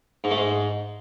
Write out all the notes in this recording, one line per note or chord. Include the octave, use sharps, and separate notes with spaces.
G#2
A3
G#2